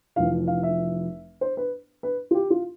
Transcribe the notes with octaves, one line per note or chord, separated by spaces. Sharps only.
F1 F2 E3 F5
F5
E5
C5
B4
B4
F4
G4
F4